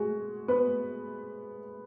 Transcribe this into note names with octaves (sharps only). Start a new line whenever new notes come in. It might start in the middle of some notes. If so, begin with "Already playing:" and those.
Already playing: G#3 F#4 G#4
B3 B4